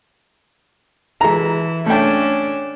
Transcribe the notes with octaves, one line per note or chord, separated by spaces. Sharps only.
E3 G#3 A#5
A3 C#4 D4 G5